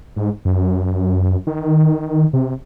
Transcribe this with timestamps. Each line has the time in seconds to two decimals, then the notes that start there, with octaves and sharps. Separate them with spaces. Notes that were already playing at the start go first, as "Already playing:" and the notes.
0.16 G#2
0.45 F#2
1.47 D#3
2.33 C3